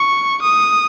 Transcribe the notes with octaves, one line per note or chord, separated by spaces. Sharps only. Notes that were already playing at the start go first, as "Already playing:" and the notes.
Already playing: C#6
D#6